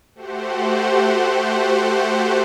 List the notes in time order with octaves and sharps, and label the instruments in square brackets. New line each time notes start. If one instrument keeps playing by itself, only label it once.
[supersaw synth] A3 F#4 G4 C5 F#5